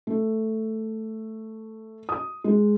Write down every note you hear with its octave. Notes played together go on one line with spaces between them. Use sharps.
A3
D#6
G#3